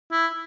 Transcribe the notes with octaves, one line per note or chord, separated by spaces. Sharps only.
E4